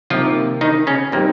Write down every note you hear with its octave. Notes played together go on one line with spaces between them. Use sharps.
C3 D#3 F3 A#3 F4
D#3 D#4
C#3 C#4
A#2 D#3 G3 A#3 C4 D#4 G4